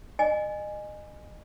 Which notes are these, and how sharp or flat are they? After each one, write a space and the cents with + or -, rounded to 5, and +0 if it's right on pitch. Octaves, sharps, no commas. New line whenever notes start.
D#5 -30 G#5 +0